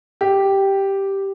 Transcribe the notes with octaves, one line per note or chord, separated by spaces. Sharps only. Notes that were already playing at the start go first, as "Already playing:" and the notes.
G4